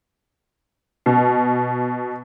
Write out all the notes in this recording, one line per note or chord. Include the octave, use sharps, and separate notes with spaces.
B2